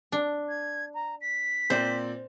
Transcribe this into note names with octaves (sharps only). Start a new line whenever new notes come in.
D4
G#6
A#5
B6
A#2 C4 C5 D5